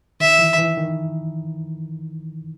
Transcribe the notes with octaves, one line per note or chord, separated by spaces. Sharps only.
D#3 E5
E3
E3
D#3